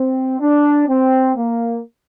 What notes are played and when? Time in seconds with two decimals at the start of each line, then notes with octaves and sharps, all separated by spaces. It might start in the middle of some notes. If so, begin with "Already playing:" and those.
Already playing: C4
0.40 D4
0.88 C4
1.36 A#3